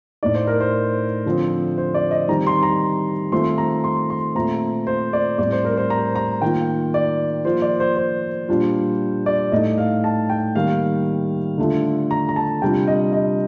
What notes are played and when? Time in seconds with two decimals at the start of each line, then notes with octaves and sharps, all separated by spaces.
0.23 A2 A3 D#4 D5
0.34 C5
0.47 A#4
0.60 C5
1.26 D3 F3 C4
1.78 C5
1.94 D5
2.11 D#5
2.28 D#3 G3 C4 D#4 A#5
2.47 C6
2.63 A#5
3.32 D#3 A3 C4 F4 C6
3.58 A#5
3.84 C6
4.10 C6
4.35 A#2 A3 C4 A#5
4.87 C5
5.13 D5
5.38 A2 G3 C4 D5
5.52 C5
5.65 A#4
5.77 C5
5.90 A#5
6.16 A#5
6.42 D#3 A#3 F4 G5
6.94 D5
7.45 F3 A#3 F4 C5
7.62 D5
7.80 C5
7.97 C5
8.49 A#2 G3 D4 F4
9.26 D5
9.52 A2 A3 D#4 D#5
9.78 F5
10.04 A5
10.30 G5
10.55 D#3 G3 A#3 F5
11.58 D3 A3 D4 F4
12.11 A#5
12.29 A#5
12.36 A5
12.62 C3 G3 D4 F4 G5
12.87 D#5
13.13 D#5